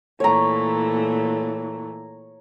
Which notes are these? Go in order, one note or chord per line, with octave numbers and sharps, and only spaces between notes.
A#2 E3 A3 C#5 A#5